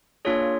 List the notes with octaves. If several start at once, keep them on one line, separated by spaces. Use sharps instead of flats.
A#3 D4 F4 G#4 C#5